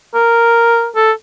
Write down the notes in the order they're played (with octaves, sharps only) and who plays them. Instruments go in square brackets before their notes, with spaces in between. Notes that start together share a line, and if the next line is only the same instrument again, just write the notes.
[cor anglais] A#4
A4